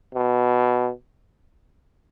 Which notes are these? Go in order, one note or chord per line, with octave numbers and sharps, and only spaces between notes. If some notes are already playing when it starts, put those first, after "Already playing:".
B2